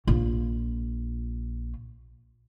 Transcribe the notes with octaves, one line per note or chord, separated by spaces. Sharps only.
A#1 F4